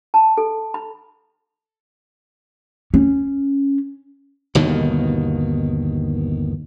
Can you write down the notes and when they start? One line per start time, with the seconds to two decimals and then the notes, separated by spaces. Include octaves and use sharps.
0.14 A5
0.38 A4
0.74 B5
2.94 C#4
4.55 G1 D#2 B2 D#3